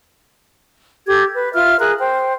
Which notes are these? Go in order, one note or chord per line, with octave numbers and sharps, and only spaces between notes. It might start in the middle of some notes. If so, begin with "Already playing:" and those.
G4 A4 G#6
B4
F4 E5 F6
G#4 A#4 F#6
C5 G5